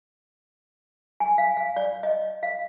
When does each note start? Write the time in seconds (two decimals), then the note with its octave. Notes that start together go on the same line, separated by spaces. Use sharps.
1.20 G#5
1.38 F5
1.57 F5
1.76 D5
2.03 D#5
2.43 F5